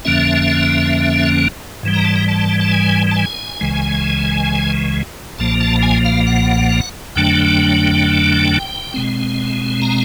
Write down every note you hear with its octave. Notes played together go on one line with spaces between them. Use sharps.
F2 D3 F3 A#3 C#4 E5
G#2 E3 G3
A#5
A5
A#5
A5
A5
G#5
A5
G#5
C#2 C#3 E3 G#3
B1 A#2 F3 A#3 A5
A5
G#5
F5
F#5
F2 D3 F#3 A3 D4 G5
B2 G#3 C4
A#5